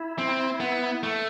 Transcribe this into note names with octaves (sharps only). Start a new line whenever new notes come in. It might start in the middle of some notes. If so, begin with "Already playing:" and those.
Already playing: E4
C4
B3
A3